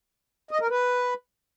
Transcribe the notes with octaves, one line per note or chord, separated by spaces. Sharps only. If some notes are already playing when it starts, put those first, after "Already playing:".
D#5
A#4
B4